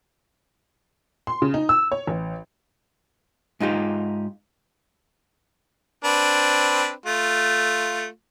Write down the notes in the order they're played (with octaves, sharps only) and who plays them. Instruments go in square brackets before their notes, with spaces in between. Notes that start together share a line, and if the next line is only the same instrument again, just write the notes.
[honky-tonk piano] C6
C#3
D#4
E6
C#5
A1
[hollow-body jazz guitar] G#2 D#4 F4 G4
[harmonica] C4 D4 B4
A3 F4